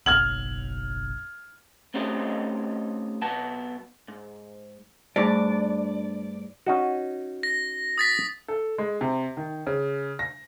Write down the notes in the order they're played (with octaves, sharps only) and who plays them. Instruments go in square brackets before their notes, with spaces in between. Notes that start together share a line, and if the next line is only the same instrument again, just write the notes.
[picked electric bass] F#1 B1 [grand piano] F6 G#6 F#7
[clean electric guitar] A3 C4 C#4 D#4 G4 D#5
B1 B2 B3 A5
G#2
[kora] G2 D4 [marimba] A3 [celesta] D#4 G#4 C5 [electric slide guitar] D5
[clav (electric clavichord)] C#4 D#4 F#4
[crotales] A#6
D#6 A6 B6
[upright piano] A4
G#3
C3
D#3
C#3
A#6